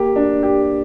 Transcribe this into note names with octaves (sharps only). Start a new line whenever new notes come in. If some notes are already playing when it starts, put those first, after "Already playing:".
Already playing: A#3 G4
D4
G4